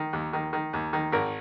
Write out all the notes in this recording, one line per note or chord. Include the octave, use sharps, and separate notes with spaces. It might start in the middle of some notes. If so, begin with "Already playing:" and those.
Already playing: D#3
D#2
D#3
D#3
D#2
D#3
G#1 A#4